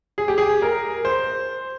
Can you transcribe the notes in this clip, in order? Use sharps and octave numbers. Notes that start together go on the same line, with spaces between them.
G#4
G4
G#4
A#4
C5